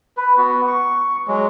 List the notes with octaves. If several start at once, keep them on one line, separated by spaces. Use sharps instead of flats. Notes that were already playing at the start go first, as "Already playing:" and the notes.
B4
B3 F#4
C#6
F#3 G#3